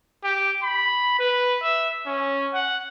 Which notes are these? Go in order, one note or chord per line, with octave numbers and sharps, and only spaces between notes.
G4
B5
B4
E5
C#4
F#5